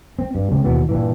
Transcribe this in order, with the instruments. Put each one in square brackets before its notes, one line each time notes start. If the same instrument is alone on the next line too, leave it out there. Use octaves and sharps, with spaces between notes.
[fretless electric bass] C4
G2
C#3 G#3 C4
D#2 B2 E3 B3
G2 A#2 E3